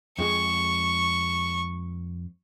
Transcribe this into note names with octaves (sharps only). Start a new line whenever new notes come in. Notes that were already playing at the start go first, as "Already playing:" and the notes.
F2 G#3 G#4 C#6